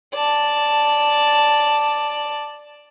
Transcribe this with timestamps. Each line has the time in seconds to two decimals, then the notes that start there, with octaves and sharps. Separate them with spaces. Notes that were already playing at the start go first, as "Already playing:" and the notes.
0.14 D5 A5